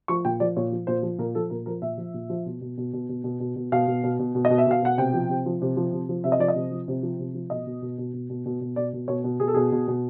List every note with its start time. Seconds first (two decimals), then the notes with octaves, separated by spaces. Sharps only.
0.08 F3 C#6
0.25 A#2 G5
0.40 F3 D5
0.57 A#2 C#5
0.72 F3
0.87 A#2 C5
1.03 F3
1.19 A#2 A#4
1.35 F3 A4
1.50 A#2 A#4
1.66 F3 A#4
1.82 A#2 E5
1.97 F3
2.14 A#2
2.30 F3
2.46 B2
2.61 B2
2.78 B2
2.93 B2
3.09 B2
3.24 B2
3.40 B2
3.56 B2
3.72 B2 F5
3.87 B2
4.04 B2
4.19 B2
4.35 B2
4.45 D#5
4.50 B2
4.58 E5
4.67 B2 F5
4.82 B2 F#5
4.98 C3 G5
5.14 F3
5.29 C3
5.46 F3
5.62 C3
5.77 F3
5.93 C3
6.09 F3
6.24 C3 E5
6.32 D#5
6.40 F3 D5
6.48 D#5
6.55 C3
6.71 F3
6.88 C3
7.03 F3
7.19 C3
7.34 F3
7.50 B2 D#5
7.67 B2
7.82 B2
7.98 B2
8.14 B2
8.30 B2
8.46 B2
8.61 B2
8.76 B2 D5
8.93 B2
9.08 B2 C#5
9.24 B2
9.40 B2 G#4
9.48 A4
9.54 B2 G#4
9.72 B2
9.88 B2